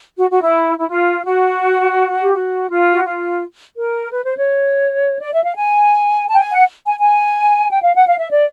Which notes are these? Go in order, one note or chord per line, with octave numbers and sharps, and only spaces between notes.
F#4
F#4
E4
E4
F4
F#4
G4
F#4
F4
F#4
F4
A#4
B4
C5
C#5
D5
E5
F5
G#5
A5
G5
G#5
F#5
G#5
G#5
G5
F5
F#5
F5
E5
D5